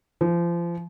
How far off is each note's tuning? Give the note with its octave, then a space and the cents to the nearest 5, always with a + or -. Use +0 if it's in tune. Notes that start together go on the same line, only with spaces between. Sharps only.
F3 -30